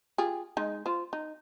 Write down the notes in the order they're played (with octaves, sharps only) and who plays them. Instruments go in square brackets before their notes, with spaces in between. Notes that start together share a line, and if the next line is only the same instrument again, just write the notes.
[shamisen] F4 G4 G#4
G#3 D#4
F4 C5
D#4